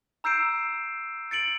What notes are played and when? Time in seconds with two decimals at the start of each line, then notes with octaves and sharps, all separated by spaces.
0.24 A#5 E6 G6 C7 D7 E7
1.31 A6 C#7 D7 F#7